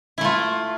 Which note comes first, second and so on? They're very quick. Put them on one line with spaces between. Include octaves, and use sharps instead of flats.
E4 A3 F4